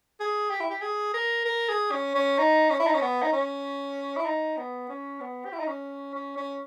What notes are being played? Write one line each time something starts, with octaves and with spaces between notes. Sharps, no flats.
G#4
G4
E4
G4
G#4
A#4
A#4
G#4
C#4
C#4
D#4
C#4
E4
D#4
C#4
B3
D#4
C#4
E4
D#4
B3
C#4
B3
G4
E4
D#4
C#4
C#4
C#4